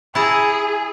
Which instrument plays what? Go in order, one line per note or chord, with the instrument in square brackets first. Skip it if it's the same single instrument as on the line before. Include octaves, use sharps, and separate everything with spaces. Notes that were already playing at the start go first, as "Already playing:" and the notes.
[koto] E4 A5 A#5 [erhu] G#4